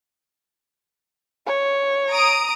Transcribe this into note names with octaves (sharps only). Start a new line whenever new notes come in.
C#5
A#5 D#6 D7